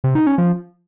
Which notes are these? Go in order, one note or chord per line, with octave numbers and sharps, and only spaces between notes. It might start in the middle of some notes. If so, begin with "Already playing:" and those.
C3
D#4
C#4
F3